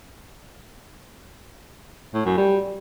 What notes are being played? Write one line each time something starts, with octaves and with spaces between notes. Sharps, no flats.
A2
F#2
G3